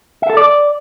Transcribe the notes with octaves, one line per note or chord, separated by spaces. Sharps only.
E5
A4
D5